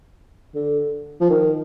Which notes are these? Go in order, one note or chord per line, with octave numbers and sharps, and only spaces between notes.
D3
F3
D#3